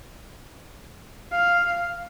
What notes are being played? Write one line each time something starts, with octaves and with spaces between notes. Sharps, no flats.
F5